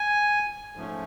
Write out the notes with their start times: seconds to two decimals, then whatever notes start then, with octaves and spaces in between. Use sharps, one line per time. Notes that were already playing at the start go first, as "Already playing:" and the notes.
Already playing: G#5
0.76 G#2 F3 A3 C#4